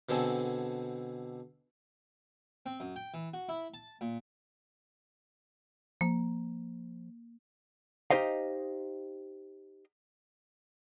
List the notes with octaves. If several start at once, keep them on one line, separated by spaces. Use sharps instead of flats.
B2 D3 C4 G#4 A4
C4
F#2
G5
E3
F#4
E4
A5
A#2
F3 A#3
D#4 G4 C5 D#5 F5